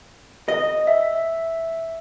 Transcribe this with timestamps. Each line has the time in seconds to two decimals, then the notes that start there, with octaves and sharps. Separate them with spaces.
0.48 D#5
0.87 E5